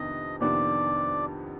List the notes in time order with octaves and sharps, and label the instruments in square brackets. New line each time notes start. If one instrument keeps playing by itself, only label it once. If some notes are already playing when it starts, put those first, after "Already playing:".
Already playing: [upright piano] F2 C3 D#3 B3 D4 [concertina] D#5
[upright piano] F2 C3 D#3 B3 D4 [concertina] D5